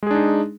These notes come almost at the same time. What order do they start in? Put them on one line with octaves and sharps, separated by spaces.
G#3 G#4 D4 D#4